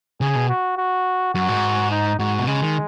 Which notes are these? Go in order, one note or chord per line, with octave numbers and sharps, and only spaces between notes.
C#3 G#4
B2
F#4
F#4
F#2 F#4
G#2
D#4
G#2 F#4
B2
C#3 G#3
D#3